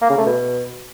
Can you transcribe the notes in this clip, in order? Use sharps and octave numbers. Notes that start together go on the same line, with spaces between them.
A#3
C#3
A3
B2